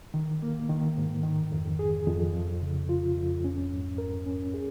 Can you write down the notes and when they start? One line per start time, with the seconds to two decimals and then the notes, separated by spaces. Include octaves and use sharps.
0.14 D#3
0.42 A#3
0.69 D#3
0.97 G#2
1.24 D#3
1.52 F2
1.79 G#4
2.07 F2
2.34 F2
2.62 C#3
2.89 F4
3.17 F2
3.44 C#4
3.71 G#2
3.98 A#4
4.26 C#4
4.54 G#4